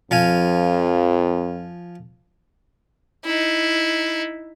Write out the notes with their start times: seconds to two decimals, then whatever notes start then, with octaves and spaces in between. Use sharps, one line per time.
0.11 F2 F3 F5 G#5
3.25 D#4 E4